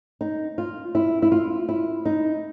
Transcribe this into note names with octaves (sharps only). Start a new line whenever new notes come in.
D#4
F4
E4
E4
F4
E4
D#4